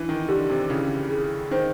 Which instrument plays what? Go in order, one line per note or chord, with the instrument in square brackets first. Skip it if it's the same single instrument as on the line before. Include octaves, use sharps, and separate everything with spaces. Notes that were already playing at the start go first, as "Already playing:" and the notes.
Already playing: [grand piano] E3 [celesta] D4
[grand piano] D#3
[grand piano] D3 [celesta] G4
[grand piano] C3
[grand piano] C#3 [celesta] E4
[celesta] G#4
[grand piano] D#3 [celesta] C5